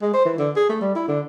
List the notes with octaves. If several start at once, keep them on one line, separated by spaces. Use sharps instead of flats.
G#3
C5
E3
D3
G#4
A3
G3
E4
D3